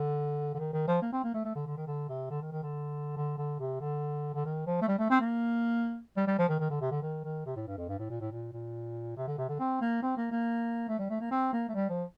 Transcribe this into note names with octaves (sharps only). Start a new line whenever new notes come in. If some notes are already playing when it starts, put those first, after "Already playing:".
Already playing: D3
D3
D#3
D#3
F3
A#3
C4
A#3
A3
A3
D3
D3
D#3
D3
C3
D3
D#3
D#3
D3
D3
D3
C3
D3
D3
D#3
F3
A3
G3
A3
C4
A#3
G3
G3
F3
D#3
D#3
D3
C3
D3
D#3
D#3
C3
A2
G2
F2
G2
A2
A#2
A2
A#2
A#2
C3
D3
C3
D3
C4
A#3
C4
A#3
A#3
A3
G3
A3
A#3
C4
A#3
A3
G3
F3